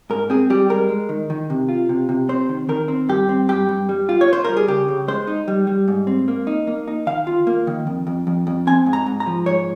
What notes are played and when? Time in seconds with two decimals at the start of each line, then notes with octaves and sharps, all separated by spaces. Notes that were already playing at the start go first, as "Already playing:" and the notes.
0.10 G#2 A#4
0.30 C4 G#4
0.50 G3 G4
0.69 G#3 A#4
0.89 G#3
1.09 D#3
1.30 D#3
1.50 C3
1.69 F4
1.89 C3
2.09 C3
2.29 C4 C5
2.49 D#3
2.69 D#3 A#4
2.88 C4
3.09 G2 G4
3.29 C4
3.49 G2 G4
3.69 G2
3.89 G3
4.09 F4
4.21 C#5
4.28 F4 C5
4.44 G3 A#4
4.57 G#4
4.68 C#3 G4
4.88 C#3
5.08 G#3 C5
5.27 D#4
5.48 G3
5.67 G3
5.88 G#2
6.07 C4
6.28 A#3
6.47 D#4
6.67 A#3
6.88 D#4
7.07 D#3 F5
7.27 F4
7.47 A#3
7.67 D#3
7.87 F2
8.07 F2
8.27 F2
8.47 F2
8.67 C4 G#5
8.86 G#2
8.93 A#5
9.06 G#2
9.20 A#5
9.26 F3
9.46 G#2 C#5